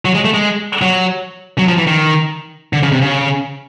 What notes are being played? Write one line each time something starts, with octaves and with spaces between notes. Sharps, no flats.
F#3
G#3
A3
G#3
F#3
F#3
F3
E3
D#3
D3
C#3
C3
C#3